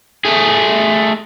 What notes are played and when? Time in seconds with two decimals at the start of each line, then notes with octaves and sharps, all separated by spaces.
0.25 A3 G#4